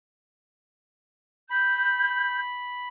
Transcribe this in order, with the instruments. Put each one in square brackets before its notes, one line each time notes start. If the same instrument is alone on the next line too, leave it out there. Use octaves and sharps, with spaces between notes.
[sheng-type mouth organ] B5 [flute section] G6